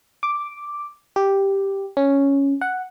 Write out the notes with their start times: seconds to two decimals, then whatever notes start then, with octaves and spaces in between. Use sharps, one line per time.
0.23 D6
1.16 G4
1.97 C#4
2.61 F#5